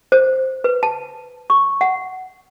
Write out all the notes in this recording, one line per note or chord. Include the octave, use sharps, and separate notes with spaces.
C5
B4
A5
C#6
F#5